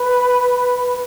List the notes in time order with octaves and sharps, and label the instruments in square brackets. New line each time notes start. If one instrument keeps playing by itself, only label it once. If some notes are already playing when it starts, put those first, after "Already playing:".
Already playing: [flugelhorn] B4